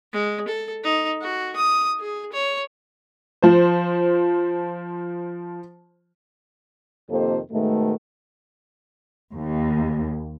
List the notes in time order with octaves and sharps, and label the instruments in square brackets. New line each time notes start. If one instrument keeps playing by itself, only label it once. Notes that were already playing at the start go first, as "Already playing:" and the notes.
[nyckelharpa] G#3
A4
D#4
F#4
D#6
G#4
C#5
[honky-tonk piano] F3 C5
[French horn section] F2 C3 D#3 A#3 A4 C5
G#2 B2 D#3 A3
[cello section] D#2